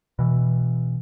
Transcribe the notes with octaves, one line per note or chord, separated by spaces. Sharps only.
B2 E3